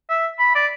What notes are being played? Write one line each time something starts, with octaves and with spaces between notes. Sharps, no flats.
E5
B5
D5